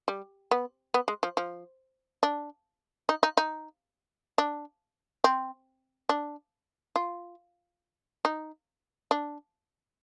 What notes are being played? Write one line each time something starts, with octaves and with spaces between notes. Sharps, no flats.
G3
B3
B3
G#3
F3
F3
D4
D#4
D#4
D#4
D4
C4
D4
F4
D#4
D4